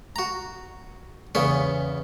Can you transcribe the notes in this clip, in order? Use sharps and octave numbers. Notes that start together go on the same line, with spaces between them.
F#4 A#5
E2 C#3 B3 C#5